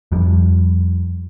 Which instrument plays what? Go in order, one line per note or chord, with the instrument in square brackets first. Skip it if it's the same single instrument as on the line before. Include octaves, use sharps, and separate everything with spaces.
[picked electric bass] F2 F3 G3